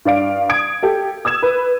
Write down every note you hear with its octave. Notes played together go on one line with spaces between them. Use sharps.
G2 D5 F5 D7
D#6 G#6 D7
G4 A4
D#6 E6 G#6 E7
B4